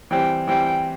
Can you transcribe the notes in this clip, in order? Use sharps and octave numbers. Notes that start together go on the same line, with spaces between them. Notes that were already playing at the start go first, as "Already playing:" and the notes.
E3 G3 C4 G5
E3 G3 C4 G5